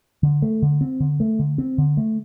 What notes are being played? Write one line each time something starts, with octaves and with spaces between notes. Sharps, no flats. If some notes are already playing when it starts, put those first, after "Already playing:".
D3
A3
D3
C4
D3
A3
D3
C4
D3
A3